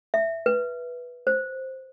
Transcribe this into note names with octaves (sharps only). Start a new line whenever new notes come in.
E5
B4
C5